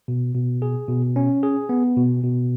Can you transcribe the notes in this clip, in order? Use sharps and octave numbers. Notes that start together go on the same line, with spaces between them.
B2
B2
G#4
B2
C#4
G#4
B3
B2
B2